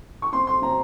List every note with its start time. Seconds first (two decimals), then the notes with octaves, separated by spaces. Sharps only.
0.22 C#6
0.32 C4 C6
0.47 C6
0.62 C4 A#5